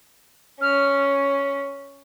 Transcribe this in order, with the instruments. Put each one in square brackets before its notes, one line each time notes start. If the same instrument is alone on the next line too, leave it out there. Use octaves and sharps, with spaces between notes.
[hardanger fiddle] C#4 [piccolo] F6